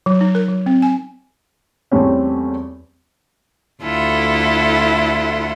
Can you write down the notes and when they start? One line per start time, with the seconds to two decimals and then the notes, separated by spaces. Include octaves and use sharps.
0.06 F#3
0.21 D#4
0.35 A#4
0.48 F#3
0.66 C4
0.82 G#5
1.92 E2 G3 A3 C4 C#4
3.83 D2 E4 F4 A4 F#5